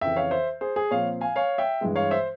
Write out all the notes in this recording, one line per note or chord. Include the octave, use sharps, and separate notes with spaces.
F2 C#3 E3 E5 G5
C#5 F5
C5 E5
G#4 C5
G#4
A#2 F3 C4 C#5 F5
F5 G#5
C#5 F5
E5 G5
G2 E3 G#3
C#5 F5
C5 E5